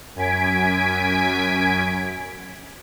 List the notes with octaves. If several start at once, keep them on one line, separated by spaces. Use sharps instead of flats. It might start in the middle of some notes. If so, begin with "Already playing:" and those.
F#2 G#5 G#6 B6 D7